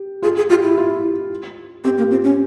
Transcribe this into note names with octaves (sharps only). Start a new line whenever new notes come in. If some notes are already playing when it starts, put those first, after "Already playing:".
Already playing: G4
F4 G#4
G#4
F4 G4
E4
F4
C4 G4
A#3
C4 F4
C#4